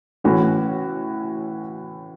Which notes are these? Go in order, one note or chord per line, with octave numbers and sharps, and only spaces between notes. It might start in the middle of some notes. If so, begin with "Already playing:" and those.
A2 E3 A3 C#4 F#4